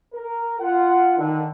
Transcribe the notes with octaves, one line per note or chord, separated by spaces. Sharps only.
A#4
F4 F#5
D3 D#3